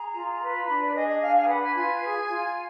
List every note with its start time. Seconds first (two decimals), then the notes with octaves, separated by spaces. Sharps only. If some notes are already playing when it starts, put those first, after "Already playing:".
Already playing: G#4 A#5
0.13 F4
0.40 B4
0.67 D4 B5
0.81 D5
0.94 G#4 D#5
1.08 D#5
1.20 D4 F5
1.35 F5
1.44 G#5
1.48 B4 F#5
1.61 G#5
1.75 F4 G#5
2.03 G#4
2.29 F4